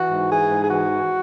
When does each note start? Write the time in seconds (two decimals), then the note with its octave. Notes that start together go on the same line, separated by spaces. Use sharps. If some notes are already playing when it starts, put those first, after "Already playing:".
Already playing: E3 F#4
0.10 G#2
0.30 E3 G#4
0.51 G#2
0.62 G#4
0.70 E3 F#4
0.91 E3